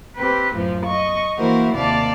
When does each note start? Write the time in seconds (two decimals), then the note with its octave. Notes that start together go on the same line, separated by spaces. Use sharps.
0.17 C4 G4 B4
0.55 F#2 A2 F3
0.85 D#5 C#6
1.38 E3 A#3 E4 F#4 A#4 C5
1.74 D#2 C3 D5 F5 A5